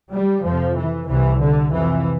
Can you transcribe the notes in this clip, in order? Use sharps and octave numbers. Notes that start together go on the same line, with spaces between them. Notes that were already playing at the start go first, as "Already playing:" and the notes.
G3
F2 C3 F3
E3
C2 C3 E3
D3
F2 C3 E3